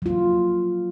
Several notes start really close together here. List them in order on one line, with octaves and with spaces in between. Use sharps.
F#3 F4 A#3